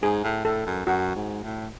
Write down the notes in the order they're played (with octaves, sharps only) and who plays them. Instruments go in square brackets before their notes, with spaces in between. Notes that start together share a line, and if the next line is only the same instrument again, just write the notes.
[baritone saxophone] G#2 [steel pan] G#4
[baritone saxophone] A2
[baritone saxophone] A2 [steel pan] A4
[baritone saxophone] F#2
[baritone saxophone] F#2 [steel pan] F#4
[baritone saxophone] G#2
A2